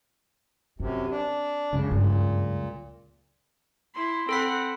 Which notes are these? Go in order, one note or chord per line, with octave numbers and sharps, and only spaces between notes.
F#2 C3 C4
D4
C#2 F#2 C#3
G2 A#2
E4 C6
C4 A4 F#5 B5 B6